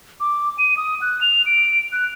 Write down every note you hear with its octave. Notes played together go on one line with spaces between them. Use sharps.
D6
D#7
D#6
F#6
F7
D7
F#6